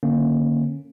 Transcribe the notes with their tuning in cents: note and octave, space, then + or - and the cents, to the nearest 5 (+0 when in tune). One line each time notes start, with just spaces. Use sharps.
D3 +20 A#3 +0 C#4 -20